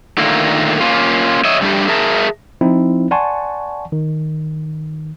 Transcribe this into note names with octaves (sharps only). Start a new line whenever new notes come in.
A#2 D3 D#3 A3 A#3
A#3 C#4 F4
C#5 D#5 E5
D3 G3 A3 D4 G4
G#4 A#4 E5 A5
F3 C4 D#4 E4
D5 F#5 G#5 A5 C6 C#6
D#3